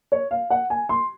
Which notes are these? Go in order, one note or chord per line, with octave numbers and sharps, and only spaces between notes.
C#5
F5
F#5
G#5
C6